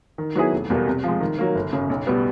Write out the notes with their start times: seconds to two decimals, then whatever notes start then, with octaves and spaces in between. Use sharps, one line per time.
0.18 D#3
0.35 F#3 B3 E4 G#4
0.52 F1
0.70 E2 B2 G3 A#3
0.86 C3
1.04 F3 G#3
1.20 D#3
1.38 F#3 A#3
1.55 G1
1.73 F#2 C#3
1.90 B1
2.07 B2 G3 B3